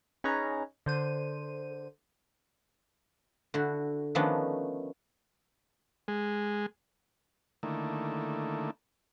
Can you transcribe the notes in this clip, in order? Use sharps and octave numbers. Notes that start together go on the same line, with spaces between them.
C#4 D#4 G#4 B4 C#5 A#5
D3 C5 D#7
D3 E4 F#4
D#3 F3 A3 B3 C#4 D4
G#3
D3 D#3 A3 A#3 E4